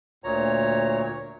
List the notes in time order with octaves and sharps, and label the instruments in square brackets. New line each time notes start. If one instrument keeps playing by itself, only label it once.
[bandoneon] D2 A#2 C#5 A#5